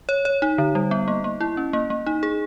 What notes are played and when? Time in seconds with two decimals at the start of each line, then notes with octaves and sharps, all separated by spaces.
0.09 C#5
0.25 C#5
0.42 D#4
0.58 D3
0.75 G3
0.91 B3
1.08 A#3
1.24 A#3
1.41 E4
1.57 C#4
1.73 A#3
1.90 A#3
2.06 D#4
2.23 G#4